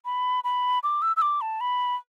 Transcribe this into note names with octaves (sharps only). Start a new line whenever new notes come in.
B5
B5
D6
E6
E6
D6
A5
B5